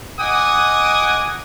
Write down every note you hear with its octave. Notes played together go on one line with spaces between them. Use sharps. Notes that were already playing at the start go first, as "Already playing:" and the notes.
D#5 F#5 G#5 D6 D#6